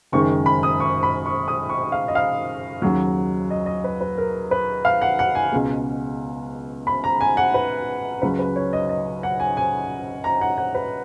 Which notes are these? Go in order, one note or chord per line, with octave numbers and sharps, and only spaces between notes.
F#1 F#2 D#3 G#3 C#6
B5
D#6
C#6
B5
C#6
D#6
C#6
F5
D#5
F5
D#2 C#3 F#3
D#5
D#5
B4
B4
A#4
B4
F5
F#5
F#5
G#5
C#2 B2 G#3
B5
A#5
G#5
F#5
B4
C#2 C#3 F#3 B4
B4
C#5
D#5
D#5
F#5
G#5
G#5
A#5
F#5
F#5
B4